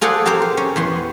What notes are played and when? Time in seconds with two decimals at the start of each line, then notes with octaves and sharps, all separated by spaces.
0.01 F4 G#4 A4 C5 D5 F#5
0.26 C4 G4 A#4 C5 F5
0.42 C5
0.57 C#4
0.76 E2 B3 C6